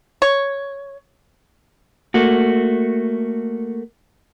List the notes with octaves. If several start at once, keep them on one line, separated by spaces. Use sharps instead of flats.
C#5
A3 A#3 F#4